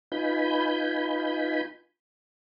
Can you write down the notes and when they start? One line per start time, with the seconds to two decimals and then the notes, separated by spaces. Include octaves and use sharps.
0.12 D#4 F4 B4 G#5 B5 G6